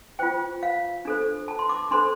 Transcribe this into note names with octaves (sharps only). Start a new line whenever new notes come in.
F4 C5 G5
F5
D4 A4 C5
A5
C6
D6
D4 A4 C5 C6